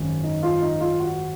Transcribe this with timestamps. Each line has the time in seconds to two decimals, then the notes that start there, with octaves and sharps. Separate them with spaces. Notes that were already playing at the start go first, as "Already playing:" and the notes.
Already playing: G#1 F#2 D#3 C#4
0.23 D#4
0.43 F4
0.62 D#4
0.80 F4
1.00 F#4